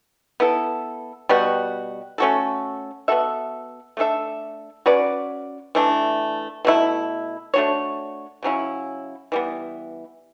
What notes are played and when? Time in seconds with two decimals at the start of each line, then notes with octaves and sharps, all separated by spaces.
0.40 B3 E4 A4
1.29 B2 G3 B3 F#4
2.18 A3 C#4 F#4 A4
3.08 B3 F#4 A4 E5
3.97 A3 D4 A4 E5
4.86 C#4 F#4 B4 D5
5.75 E3 A3 D4
6.65 B2 A3 E4
7.54 A3 D4 F#4 C#5
8.43 C#3 F#3 C#4 E4
9.32 E3 G3 B3